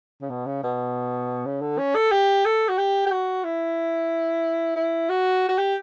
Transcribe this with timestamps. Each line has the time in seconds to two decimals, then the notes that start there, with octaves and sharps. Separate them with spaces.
0.21 C#3
0.30 B2
0.46 C#3
0.63 B2
1.46 C#3
1.61 D3
1.78 C#4
1.95 A4
2.11 G4
2.45 A4
2.69 F#4
2.78 G4
3.06 G4
3.11 F#4
3.44 E4
4.76 E4
5.10 F#4
5.49 F#4
5.58 G4